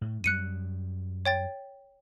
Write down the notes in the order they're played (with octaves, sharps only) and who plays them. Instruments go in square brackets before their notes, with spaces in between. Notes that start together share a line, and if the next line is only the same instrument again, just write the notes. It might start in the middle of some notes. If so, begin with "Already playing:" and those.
[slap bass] A2
[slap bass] F#2 G3 [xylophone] F#6 C#7 D#7
[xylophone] C#5 G5 A6